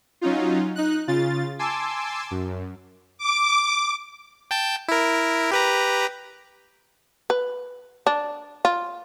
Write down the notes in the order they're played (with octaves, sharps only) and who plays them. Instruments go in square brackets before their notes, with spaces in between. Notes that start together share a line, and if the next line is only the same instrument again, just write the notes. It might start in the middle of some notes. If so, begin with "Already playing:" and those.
[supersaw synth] F#3 C#4 D#4 F4
D#4 F#6
C#3 F4 A6
G#5 A5 C6 D6 E6
F#2
[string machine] D6
[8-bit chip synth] G5 A5 G6
E4 A#4
G4 B4 A#5
[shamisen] B4
D4
F4